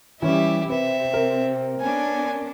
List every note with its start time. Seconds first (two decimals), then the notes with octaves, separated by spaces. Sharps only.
0.22 E3 G3 C#4 E4 G4 E5
0.70 C3 C4 B4 E5
1.14 A#4
1.81 B3 C#4 D4 G#5